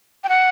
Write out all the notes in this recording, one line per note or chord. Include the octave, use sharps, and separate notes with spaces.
G5
F#5